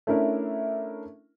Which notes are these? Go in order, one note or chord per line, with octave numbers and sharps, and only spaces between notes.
A3 C#4 D4 E4 A#4